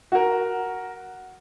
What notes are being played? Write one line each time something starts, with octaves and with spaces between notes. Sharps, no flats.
F#4 A#4